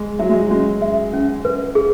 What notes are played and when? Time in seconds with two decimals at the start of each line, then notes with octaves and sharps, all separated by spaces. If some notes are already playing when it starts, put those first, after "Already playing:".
Already playing: G#3 G#4
0.19 F#3 E5
0.30 G#3
0.40 F#3
0.51 G#3 C#4
0.82 E5
1.14 C#4
1.45 B4
1.75 G#4